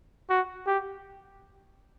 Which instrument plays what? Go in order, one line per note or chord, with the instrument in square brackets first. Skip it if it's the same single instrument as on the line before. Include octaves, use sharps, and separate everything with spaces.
[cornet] F#4
G4